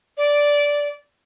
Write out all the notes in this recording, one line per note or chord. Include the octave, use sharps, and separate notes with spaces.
D5